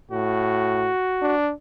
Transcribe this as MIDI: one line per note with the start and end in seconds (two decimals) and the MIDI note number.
0.11 0.90 45
0.11 1.34 66
1.22 1.51 62